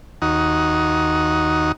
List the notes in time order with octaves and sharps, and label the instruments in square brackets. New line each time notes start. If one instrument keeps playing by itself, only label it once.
[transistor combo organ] D#2 D#4 F#4